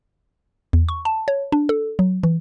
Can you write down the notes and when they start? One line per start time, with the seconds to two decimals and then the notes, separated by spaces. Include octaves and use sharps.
0.73 E2
0.89 C#6
1.05 A5
1.28 C#5
1.52 D4
1.69 A4
1.99 F#3
2.23 E3